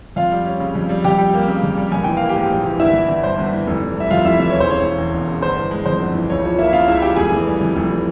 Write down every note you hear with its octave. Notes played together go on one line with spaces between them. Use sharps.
F2 F4 F5
G3
C#4
C#3
F2
G3
F2 G4 G5
G3
A#3
C#3
F2
G3
A#1 G#5
E3 G5
A#3 F5
G4 G5
G#2
A#1
E3
G1 E4 E5
E3
G1
G2 C5
G1
E3
F1
E3
G3 E5
F2 F4 F5
F1 E4 E5
E3 E5
E1 C#5
C5
C#3 C#5
E3
E2
E1
C#3
G1 C5
E3
G#3
F2 C5
G1
E3
C#2 C#5
F3 C#5
A#3 E4 E5
C#3 F4 F5
C#2 E4 E5
F3 G4 G5
F1 G#4 G#5
E3
G3
F2
F1
E3